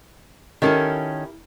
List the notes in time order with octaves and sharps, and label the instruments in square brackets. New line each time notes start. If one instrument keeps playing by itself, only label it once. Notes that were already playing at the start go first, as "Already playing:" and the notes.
[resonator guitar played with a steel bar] D#3 C#4 A4 [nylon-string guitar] E4 G4 A#4